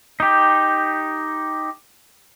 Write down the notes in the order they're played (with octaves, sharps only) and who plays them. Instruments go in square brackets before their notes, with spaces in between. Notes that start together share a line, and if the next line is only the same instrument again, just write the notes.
[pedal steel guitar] D#4 G4